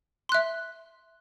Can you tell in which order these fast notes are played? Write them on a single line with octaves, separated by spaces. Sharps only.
C6 F#6 E5